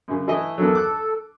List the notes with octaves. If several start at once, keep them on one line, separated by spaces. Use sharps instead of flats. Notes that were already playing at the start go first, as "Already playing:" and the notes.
F#2 C#3
E3 A3 E4 D#5
E2 D#3 F#3 A4
D6 F#6